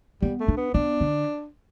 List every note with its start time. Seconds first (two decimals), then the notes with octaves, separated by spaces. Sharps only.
0.22 G3 B3
0.40 A3
0.48 D4
0.57 B3
0.74 B3 D4
1.01 D3